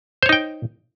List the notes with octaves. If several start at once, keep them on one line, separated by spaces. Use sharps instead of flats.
D#4 C5 C#5 G5